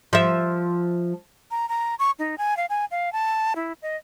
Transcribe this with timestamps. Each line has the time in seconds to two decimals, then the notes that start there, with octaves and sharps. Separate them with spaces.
0.13 F3 E5
1.51 A#5
1.69 A#5
1.99 C#6
2.19 D#4
2.38 G#5
2.57 F5
2.69 G#5
2.91 F5
3.13 A5
3.56 E4
3.82 D#5